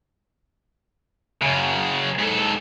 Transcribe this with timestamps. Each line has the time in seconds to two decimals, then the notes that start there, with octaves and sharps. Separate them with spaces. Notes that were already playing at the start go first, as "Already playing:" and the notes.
1.42 F#2 C#3
2.19 G#2 A4